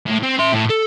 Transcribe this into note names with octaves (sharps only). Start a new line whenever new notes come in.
A2
C4
E5 C6
A2
A4